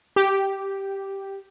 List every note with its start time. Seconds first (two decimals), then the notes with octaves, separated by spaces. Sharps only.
0.16 G4